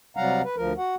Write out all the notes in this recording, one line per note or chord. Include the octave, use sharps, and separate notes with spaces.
C3 F#3 G3 F5 F#5 A#5
B4
D2 F3 A#4
F#4 F#5